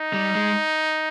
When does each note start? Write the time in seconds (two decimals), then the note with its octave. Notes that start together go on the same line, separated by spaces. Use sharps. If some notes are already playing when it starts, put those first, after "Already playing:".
Already playing: D#4
0.13 G3
0.35 G#3